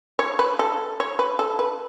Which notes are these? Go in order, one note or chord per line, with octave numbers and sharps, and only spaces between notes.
C#5
B4
A4
C#5
B4
A4
B4